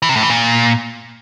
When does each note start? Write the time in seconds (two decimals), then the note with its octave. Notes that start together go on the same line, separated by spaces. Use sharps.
0.02 E3
0.09 C3
0.16 A2
0.23 E3
0.30 A#2